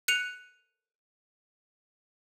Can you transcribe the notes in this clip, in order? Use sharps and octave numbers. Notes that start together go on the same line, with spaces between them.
F#6 C#7 D#7 F7